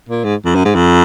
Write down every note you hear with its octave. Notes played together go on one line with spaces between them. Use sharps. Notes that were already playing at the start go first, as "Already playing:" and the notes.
A#2
G#2
F2
F#2
G#2
F2